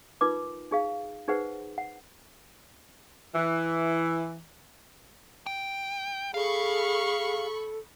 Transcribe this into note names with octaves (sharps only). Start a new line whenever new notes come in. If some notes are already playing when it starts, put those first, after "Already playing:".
D#4 F4 A#4 B4 D6
D#4 G#4 F5
D#4 G#4 B4 C5 F#5
F#5
E3
G5
G#4 A4 F5 B5 C#6
A4